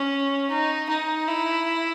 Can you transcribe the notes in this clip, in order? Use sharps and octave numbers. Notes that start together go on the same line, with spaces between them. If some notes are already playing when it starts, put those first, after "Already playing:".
Already playing: C#4
D#4
D#4
E4